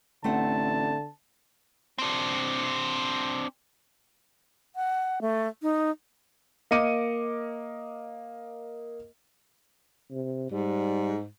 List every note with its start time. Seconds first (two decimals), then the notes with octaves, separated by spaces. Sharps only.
0.24 A1 D3 A3 C4 F#5 A5
1.98 C4 D4
4.76 F#5
5.22 A3
5.62 D#4
6.71 A#3 A#4 D#5 D6 C#7 D#7
10.11 C3
10.51 G#2 G3